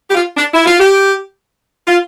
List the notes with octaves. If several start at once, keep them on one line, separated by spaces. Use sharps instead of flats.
G4
F4
D4
E4
F4
G4
F4